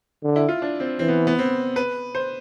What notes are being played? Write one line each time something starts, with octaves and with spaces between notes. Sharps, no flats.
D3
E4
F4
D4
C4
E3 C4
B3
B3
C4
B4
C5